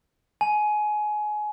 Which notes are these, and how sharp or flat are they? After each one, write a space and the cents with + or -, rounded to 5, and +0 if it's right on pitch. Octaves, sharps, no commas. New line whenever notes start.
G#5 +25